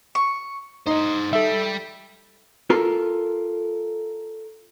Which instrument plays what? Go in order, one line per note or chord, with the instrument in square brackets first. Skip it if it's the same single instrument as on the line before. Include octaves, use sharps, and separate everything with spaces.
[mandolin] C#6
[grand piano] D#4 [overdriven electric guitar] C5 D#5
[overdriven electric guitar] G3 [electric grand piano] A4 E5
[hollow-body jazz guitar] F4 A4 A#4